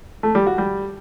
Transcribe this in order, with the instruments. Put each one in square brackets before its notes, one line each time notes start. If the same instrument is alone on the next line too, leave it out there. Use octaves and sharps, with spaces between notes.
[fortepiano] A3
G3
F#4
G3